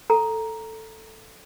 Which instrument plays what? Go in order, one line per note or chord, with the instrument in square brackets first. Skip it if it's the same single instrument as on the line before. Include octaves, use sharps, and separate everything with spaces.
[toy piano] A4 A#5